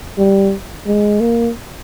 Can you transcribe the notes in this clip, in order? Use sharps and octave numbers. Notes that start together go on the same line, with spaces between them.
G3
G#3
A#3